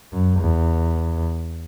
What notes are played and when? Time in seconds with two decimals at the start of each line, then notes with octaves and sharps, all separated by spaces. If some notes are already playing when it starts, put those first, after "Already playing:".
0.12 F#2
0.41 E2